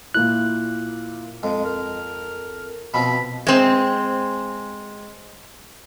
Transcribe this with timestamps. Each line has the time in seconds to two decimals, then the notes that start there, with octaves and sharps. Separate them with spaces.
0.14 A#2 A#3 E4 F#6
1.43 F2 G#3
1.64 A#4
2.94 B2 F3 C4 B5
3.47 G#3 C4